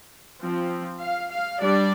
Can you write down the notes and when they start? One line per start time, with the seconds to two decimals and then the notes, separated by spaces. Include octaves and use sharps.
0.41 F3 C4
1.00 F5
1.31 F5
1.61 G3 D4 D5